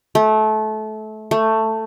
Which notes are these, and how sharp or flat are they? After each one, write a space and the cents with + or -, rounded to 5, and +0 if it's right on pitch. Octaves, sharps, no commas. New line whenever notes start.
A3 -25
A3 +10